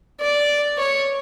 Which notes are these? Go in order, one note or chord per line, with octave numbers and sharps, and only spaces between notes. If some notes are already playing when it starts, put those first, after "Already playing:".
D5
C#5